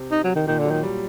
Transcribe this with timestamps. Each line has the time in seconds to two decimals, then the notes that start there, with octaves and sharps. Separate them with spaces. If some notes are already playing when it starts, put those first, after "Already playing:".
Already playing: C3
0.12 D#4
0.24 F#3
0.35 D#3
0.47 A#2 D#3
0.59 D3
0.65 F#3
0.71 D#3
0.83 G3